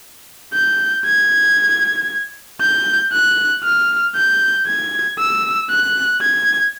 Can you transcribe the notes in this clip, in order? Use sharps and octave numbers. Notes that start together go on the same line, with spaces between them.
G6
G#6
G6
F#6
F6
G6
G#6
E6
F#6
G#6